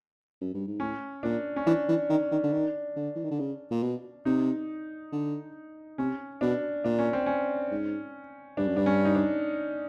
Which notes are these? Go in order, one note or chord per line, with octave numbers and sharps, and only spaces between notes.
F#2
G2
G#2
A2 C#4
A#2 D4
C#4
E3 D4
E3
D#3
D#3
D3
D#3
D3
E3
D#3
D3
C#3
A#2
B2
C3 D#4
D3
C3 C#4
B2 D4
A#2 D4
C#4
C4
C#4
G#2
G2 D4
F#2
G2 D4
C#4
D#4
D4